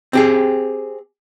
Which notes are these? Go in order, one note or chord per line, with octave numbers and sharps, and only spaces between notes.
C4 G4 G#4